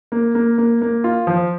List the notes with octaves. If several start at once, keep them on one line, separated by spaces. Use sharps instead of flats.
A#3
A#3
A#3
A#3
F4
F3